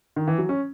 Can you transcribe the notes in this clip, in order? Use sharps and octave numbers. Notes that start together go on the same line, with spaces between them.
D#3
E3
F#3
C#4